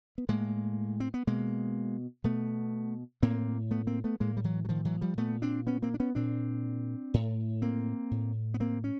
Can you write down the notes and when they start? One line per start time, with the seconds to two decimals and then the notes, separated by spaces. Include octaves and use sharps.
0.18 B3
0.29 A2 G#3 A#3
1.00 C4
1.14 B3
1.27 B2 G#3 A#3
2.24 B2 A3 B3
3.22 A2 A#3 C4
3.71 A3 B3
3.87 A#3 C4
4.04 A3 B3
4.20 A2 G#3 A#3
4.37 G3
4.44 E3 F#3
4.65 F#3
4.69 D#3 F3
4.85 E3 F#3
5.01 F3 G3
5.18 A#2 A3 B3
5.42 C4 D4
5.67 B3 C#4
5.82 A#3 C4
5.94 D4
6.00 B3 C#4
6.15 A#2 C4 D4
7.14 A2
7.62 A#3 C4
8.11 A2
8.54 B3
8.60 A#3 C4
8.84 C#4